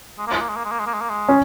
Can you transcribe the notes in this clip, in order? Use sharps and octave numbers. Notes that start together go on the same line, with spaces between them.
G#3
A#3
G#3
A#3
G#3
A#3
G#3
A#3
G#3
A#3
G#3
A#3
G#3
C#4